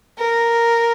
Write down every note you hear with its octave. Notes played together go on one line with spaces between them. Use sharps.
A#4